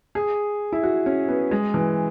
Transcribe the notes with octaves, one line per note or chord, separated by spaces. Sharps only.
G#4
E4
F#4
C#4
B3
G#3
E3